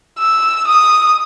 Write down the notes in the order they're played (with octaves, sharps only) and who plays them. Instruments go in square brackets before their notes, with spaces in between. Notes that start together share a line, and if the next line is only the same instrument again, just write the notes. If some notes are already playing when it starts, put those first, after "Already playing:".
[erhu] E6
D#6